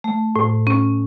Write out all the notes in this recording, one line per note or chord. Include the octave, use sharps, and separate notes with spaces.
A3
A2
C#4